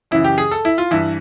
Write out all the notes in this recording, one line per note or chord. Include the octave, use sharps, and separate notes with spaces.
F#2 C#3 E3 E4
G4
G#4
A4
E4
F4
G2 E3 E4